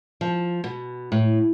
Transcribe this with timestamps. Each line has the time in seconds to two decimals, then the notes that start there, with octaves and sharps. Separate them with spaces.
0.21 F3
0.64 B2
1.12 A2